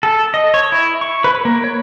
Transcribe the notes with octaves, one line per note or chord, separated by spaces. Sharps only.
A4
D#5
C#5
E4
C#6
B4
A#3
C#5